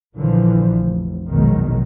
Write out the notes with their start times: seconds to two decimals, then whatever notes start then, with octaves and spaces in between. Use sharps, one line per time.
0.15 A#1 A#2 D3 E3 F3
0.78 F1
1.28 A#1 E2 B2 D#3 F#3 G#3